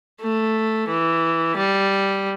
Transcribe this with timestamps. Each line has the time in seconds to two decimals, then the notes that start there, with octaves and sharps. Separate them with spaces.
0.22 A3
0.89 E3
1.57 G3